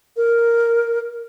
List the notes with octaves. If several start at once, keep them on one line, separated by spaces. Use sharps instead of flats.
A#4